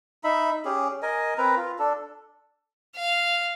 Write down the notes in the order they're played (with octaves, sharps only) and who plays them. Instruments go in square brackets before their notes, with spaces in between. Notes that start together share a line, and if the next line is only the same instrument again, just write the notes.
[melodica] D#4 E5 B5
C#4 G4 G#4
A#4 D#5 G#5
C4 A#4 B4 A#5
F4
D4 A4
[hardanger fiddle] F5